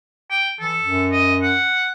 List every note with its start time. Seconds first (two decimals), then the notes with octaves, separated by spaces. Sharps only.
0.30 G5
0.60 E3 A4
0.79 F#2
1.12 D#5
1.42 F#5